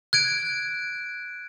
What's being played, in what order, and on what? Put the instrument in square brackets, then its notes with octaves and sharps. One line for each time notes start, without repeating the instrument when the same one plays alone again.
[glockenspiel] F#6 G#6 D7